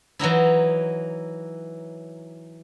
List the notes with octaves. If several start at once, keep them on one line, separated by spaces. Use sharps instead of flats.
E3 F#3 D#4 E4